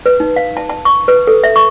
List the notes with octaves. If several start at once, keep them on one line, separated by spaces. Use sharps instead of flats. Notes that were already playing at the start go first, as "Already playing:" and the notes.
B4
D#4
F5
A5
A5
C#6
B4
A4
E5
C#6